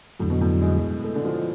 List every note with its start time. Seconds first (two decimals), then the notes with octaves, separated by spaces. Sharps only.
0.19 F2 A2 D3 F#3
0.30 B2
0.41 A2
0.62 G#3
1.04 A3
1.16 D3
1.25 F3